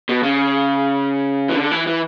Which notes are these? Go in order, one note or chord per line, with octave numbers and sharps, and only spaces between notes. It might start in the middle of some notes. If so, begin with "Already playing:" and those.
B2
C#3
E3
D3
E3
E3